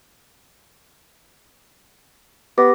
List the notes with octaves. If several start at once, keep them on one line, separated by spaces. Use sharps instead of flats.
B3 G4 D6 A#6